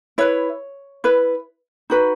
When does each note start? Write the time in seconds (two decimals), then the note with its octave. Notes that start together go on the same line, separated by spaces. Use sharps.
0.18 E4 B4 C#5
1.04 E4 B4
1.90 D#4 F#4 B4